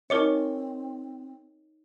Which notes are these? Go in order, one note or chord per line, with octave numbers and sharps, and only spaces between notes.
C4 D#4 A#4 C#5 D#5 D6 C#7